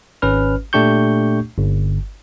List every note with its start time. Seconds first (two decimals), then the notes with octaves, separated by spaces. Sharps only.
0.22 G#1 C#4 B4 F6
0.73 A#2 A3 D4 G4 C#6 G6
1.58 G1